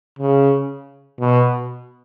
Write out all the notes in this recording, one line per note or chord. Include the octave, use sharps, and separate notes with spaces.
C#3
B2